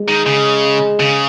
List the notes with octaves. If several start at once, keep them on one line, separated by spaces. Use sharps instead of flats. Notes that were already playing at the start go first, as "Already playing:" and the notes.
Already playing: G#3
D#3
C#3
C#3